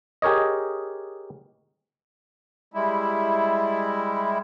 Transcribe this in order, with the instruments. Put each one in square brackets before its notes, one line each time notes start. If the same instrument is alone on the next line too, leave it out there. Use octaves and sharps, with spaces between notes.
[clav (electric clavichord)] G4 G#4 A#4 C#5 D#5
[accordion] G3 G#3 E4